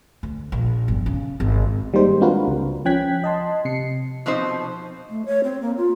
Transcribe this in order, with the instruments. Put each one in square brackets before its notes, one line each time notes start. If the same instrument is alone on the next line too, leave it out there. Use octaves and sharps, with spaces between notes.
[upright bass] D2
A#1
G1
C#3
G#1
[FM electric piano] D#3 G3 G#3 A#3 D#4 C5
C4 D4 F4 F#4 A#4 B4
C#2
F3 C#4 G5 F#6 G#6 B6
D#5 A5 C6
C3 C7 C#7
[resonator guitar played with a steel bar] B2 F3 C4 D#4 C5
[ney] A3
C#5
C4
A#3
F4